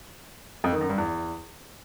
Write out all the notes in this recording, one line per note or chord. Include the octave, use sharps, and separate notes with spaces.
F2
D#3
F#2
G2
E2